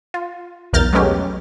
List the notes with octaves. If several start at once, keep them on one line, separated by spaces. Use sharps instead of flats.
F4
B1 E2 A#4 F6 G6 A6
F#3 G#3 A3 B3 C#4 G4